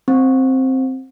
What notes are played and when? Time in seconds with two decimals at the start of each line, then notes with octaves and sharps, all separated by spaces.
0.08 C4